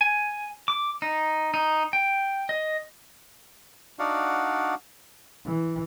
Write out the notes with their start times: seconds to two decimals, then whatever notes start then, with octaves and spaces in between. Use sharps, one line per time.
0.01 G#5
0.68 D6
1.02 D#4
1.54 D#4
1.93 G5
2.49 D#5
3.99 D4 D#4 F#4 D5 F5 F#5
5.46 E3